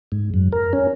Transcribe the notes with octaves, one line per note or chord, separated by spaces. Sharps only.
G#2
F#2
A#4
C#4